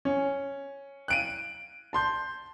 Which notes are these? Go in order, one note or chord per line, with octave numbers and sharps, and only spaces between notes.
C#4
F#6 D7 D#7
A5 C6 G6